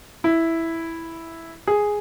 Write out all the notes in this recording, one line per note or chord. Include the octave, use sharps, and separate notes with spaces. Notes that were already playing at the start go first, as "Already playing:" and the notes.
E4
G#4